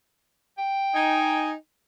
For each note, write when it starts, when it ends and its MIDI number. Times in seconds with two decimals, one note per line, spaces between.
0.58 1.52 79
0.95 1.52 63
0.95 1.52 80